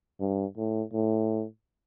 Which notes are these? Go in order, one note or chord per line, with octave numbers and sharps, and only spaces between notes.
G2
A2
A2